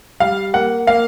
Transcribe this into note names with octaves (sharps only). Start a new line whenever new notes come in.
G3 F5
A#3 F#5
A#3 F5